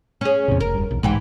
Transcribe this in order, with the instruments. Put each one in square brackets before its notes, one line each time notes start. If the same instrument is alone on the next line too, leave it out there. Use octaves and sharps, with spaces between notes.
[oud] C#4 G#4
[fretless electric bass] E2 A2 C3
[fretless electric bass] F1 [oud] A#4
[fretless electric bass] E1 G2
B1 E2
[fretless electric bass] B1 G#3 [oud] G#2 E3 G4